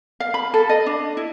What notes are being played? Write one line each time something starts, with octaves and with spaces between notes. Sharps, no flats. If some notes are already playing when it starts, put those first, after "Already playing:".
F5
B5
A4
D#5
D4
E4